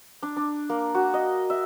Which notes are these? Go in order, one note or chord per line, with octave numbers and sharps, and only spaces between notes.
D4
D4
A#3
F#4
D#5
E5